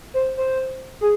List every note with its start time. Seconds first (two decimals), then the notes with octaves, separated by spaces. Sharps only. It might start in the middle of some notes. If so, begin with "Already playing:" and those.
0.14 C5
0.37 C5
1.01 G#4